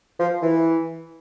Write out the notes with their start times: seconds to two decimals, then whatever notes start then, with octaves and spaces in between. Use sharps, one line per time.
0.18 F3
0.42 E3